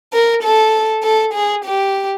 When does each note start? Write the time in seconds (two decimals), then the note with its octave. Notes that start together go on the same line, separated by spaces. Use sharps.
0.13 A#4
0.43 A4
1.03 A4
1.34 G#4
1.65 G4